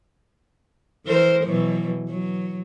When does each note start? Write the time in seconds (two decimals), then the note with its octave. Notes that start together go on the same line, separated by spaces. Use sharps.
1.06 E3 A#4 C5
1.44 B2 E3 F#3
2.08 F#3